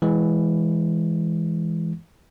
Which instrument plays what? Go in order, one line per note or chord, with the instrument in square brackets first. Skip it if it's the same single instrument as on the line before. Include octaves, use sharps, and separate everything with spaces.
[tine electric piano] E3 G#3